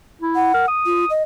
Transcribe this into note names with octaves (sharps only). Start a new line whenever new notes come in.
E4
F#5
A#4
D#6
F4
D#5